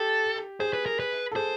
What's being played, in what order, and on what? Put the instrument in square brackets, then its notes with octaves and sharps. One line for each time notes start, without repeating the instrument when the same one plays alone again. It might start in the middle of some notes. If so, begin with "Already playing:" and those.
Already playing: [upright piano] G4 [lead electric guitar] A4
[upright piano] G#4 [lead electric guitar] C5
[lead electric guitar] B4
A#4
B4
[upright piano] A4
[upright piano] G#4 [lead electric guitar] C5